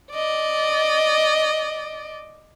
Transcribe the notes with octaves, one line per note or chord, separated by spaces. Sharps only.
D5 D#5